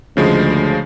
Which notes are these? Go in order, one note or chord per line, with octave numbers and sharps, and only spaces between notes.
D2 C#3 F3 G#3